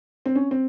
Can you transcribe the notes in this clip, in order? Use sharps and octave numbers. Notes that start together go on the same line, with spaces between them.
C4
C#4
C4